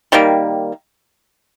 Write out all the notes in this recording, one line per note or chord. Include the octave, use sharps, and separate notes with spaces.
D#3 G3 A#3